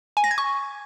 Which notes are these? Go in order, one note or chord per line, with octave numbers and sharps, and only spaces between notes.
G#5
A#6
G#6
C#6